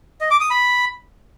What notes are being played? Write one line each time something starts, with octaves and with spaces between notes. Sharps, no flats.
D#5
D6
D#6
B5